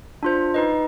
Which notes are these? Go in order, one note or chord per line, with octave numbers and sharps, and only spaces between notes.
D4 F4 C5
D#4 B4 D#5